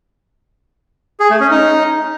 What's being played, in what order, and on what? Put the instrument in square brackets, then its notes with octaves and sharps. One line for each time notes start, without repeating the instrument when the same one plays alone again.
[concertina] G#4
A3
C#4
D#4